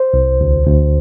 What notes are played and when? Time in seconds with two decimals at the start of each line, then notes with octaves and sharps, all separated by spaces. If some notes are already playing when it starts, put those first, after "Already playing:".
Already playing: C5
0.14 C2
0.41 D2
0.67 D2